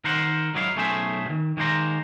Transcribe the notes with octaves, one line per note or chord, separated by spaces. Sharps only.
D#3 A#4 C5 F#5
G#2 F#3 D#4 E4 D5 F5
B1 A3 C#4 G#4 C5 E5
B2 D#3
D#3 G#3 A#3 C5 A#5